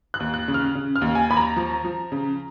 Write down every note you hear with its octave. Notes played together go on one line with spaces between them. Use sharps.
F#6
D#2
F#6
C#3
F6
C#3
F6
D#2
G#5
D#2 B5
A#5
F3
F3
C#3